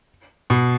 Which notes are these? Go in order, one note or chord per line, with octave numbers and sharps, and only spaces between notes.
B2